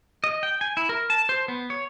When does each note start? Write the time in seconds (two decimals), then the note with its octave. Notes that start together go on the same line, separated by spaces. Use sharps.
0.24 D#5
0.43 G5
0.61 G#5
0.77 E4
0.89 A#4
1.10 A5
1.29 C5
1.48 B3
1.70 C#5